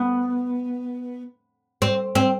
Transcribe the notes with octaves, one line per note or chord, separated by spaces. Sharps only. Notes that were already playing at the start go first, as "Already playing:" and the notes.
Already playing: B3
C4
C4